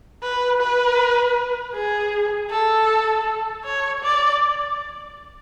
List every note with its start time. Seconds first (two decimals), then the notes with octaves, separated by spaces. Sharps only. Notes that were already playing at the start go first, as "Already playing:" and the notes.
0.23 B4
0.61 B4
1.75 G#4
2.51 A4
3.65 C#5
4.03 D5